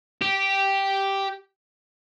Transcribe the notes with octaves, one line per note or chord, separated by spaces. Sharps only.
G4